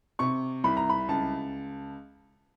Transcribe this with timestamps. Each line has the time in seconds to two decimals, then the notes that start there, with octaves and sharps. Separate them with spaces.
0.19 C3 C#6
0.64 C2 B5
0.77 A#5
0.89 B5
1.08 C#2 A5